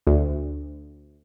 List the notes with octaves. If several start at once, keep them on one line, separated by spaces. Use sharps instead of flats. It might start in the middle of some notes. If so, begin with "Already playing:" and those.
D2